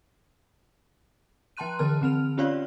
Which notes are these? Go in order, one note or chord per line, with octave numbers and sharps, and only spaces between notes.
F3 G5 A5 C6 F#6 D#7
D3 E3 A#4 A5 F6
D3 C4 F6 F7
C#4 F4 G4 C#5 D5 F5